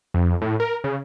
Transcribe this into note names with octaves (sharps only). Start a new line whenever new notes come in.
F2
A2
A#4
C#3